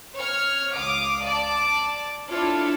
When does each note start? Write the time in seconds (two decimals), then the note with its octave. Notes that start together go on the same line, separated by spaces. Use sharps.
0.17 C#5 F6
0.75 C#2 F5 D6 D#6
1.23 D5 A5 D6
2.30 D4 E4 F4 A4 C#5